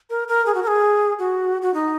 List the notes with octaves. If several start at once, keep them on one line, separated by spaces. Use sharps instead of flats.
A#4
A#4
G#4
F#4
A#4
G#4
F#4
F#4
D#4